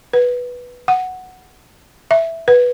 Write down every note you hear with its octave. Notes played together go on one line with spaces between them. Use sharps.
B4
F#5
E5
B4